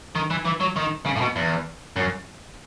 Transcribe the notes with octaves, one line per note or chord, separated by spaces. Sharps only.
D#3
E3
E3
F#3
D#3
C#3
A2
B2
E2
F#2